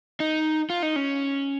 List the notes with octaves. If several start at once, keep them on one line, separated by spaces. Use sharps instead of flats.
D#4
F4
D#4
C#4